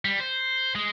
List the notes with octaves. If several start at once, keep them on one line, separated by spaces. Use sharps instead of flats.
G3
C5
G#3